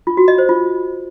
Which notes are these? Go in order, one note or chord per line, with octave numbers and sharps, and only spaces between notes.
F4
F#4
D#5
C5
F4